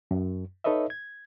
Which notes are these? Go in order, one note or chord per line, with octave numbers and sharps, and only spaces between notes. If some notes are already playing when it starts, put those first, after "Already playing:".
F#2
D#4 A4 B4 C#5 D#5 E5
G#6